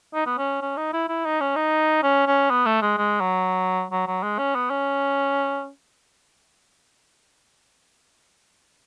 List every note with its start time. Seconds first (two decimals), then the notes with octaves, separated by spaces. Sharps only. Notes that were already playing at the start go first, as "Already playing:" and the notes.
0.14 D#4
0.26 B3
0.38 C#4
0.62 C#4
0.77 D#4
0.93 E4
1.09 E4
1.25 D#4
1.41 C#4
1.56 D#4
2.03 C#4
2.27 C#4
2.50 B3
2.66 A3
2.82 G#3
2.98 G#3
3.21 F#3
3.92 F#3
4.07 F#3
4.23 G#3
4.39 C#4
4.55 B3
4.70 C#4